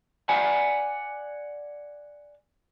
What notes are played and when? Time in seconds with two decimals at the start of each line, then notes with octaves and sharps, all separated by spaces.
0.29 D5 F#5 G#5